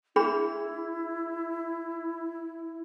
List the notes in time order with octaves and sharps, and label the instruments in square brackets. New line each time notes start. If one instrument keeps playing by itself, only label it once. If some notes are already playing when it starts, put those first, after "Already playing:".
[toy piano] D4 G#4 B5 [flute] E4